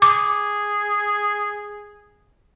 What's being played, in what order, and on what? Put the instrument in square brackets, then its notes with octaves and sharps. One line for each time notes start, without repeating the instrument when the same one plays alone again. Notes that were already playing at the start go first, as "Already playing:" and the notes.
[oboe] G#4 [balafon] D6